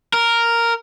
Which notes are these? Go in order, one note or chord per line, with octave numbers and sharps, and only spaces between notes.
A#4